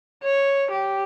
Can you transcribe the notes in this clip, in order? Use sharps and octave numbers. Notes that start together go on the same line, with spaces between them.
C#5
G4